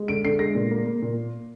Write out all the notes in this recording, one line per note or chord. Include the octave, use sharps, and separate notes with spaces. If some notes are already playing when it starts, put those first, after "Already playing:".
Already playing: G#3
D3 D7
D3 C7
G#3 A#6
A#2
A#3
A#3
A#2